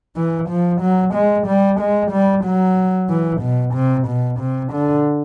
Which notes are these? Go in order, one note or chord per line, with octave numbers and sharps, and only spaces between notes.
E3
F3
F#3
G#3
G3
G#3
G3
F#3
E3
B2
C3
B2
C3
D3